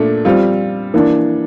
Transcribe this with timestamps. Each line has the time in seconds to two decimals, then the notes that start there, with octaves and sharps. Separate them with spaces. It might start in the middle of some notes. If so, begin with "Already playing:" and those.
Already playing: A#2 A3 D4
0.25 G3 C4 F4
0.94 E3 A#3 D4